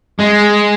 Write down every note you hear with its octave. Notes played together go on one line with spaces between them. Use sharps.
G#3